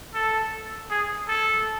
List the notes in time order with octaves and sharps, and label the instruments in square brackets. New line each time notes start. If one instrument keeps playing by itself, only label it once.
[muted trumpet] A4
G#4
A4